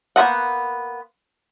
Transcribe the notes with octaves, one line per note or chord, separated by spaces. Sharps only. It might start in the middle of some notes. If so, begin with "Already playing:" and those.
A#3 B3 C5 D#5 F#5